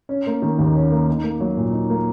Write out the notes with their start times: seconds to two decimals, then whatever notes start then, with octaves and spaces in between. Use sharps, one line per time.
0.09 C#4
0.27 A#3
0.42 D#3
0.59 D#2
0.75 C#4
0.91 A#3
1.08 D#4
1.24 A#3
1.40 F#3
1.57 A#2
1.73 D#4
1.90 A#3